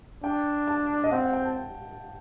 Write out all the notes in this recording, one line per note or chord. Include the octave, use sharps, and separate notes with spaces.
D4 G5
A5
D#5
C4 F#5
F#5
G5
A5